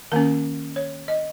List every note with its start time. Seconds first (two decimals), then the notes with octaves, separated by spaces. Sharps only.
0.12 D#3 A#3 C#4 A#4
0.76 C#5
1.08 D#5